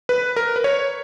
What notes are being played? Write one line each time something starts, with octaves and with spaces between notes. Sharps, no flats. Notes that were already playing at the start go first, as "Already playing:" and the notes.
B4
A#4
B4
C#5